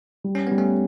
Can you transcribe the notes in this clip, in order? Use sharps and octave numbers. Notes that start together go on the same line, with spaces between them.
G3
C#4
G3 B3
A3 C#4